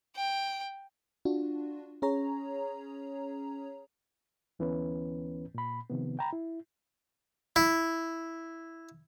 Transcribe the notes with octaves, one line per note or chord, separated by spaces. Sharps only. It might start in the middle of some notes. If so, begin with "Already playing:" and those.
G5
D4 F4 F#4
C#4 G#4 C#5 A#5
D2 E3 B3 C#4 B4
A#2 B5
C3 D#3 F3 B3
G5 A#5 B5
E4
E4